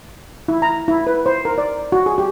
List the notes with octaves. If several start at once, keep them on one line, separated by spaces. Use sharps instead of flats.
E4
A#5
E4
B4
C5
A#4
D5
F#4
G#4
G4